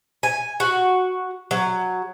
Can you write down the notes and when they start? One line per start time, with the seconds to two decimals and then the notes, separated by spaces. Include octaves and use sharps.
0.23 G#5
0.60 F#4
1.51 F#3